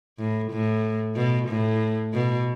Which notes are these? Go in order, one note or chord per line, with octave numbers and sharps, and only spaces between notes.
A2
A2
B2
A2
B2